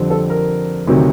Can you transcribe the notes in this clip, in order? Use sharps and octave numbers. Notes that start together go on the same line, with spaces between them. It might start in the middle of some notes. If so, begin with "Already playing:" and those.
Already playing: F2 D3 G3 C4
A4
A#4
D2 C3 D#3 F#3